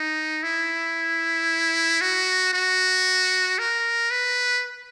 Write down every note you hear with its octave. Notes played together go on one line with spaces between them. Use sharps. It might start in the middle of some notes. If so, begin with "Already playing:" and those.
Already playing: D#4
E4
F#4
F#4
A#4
B4